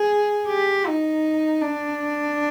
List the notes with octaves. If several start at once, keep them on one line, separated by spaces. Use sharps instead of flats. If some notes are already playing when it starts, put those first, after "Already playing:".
Already playing: G#4
G4
D#4
D4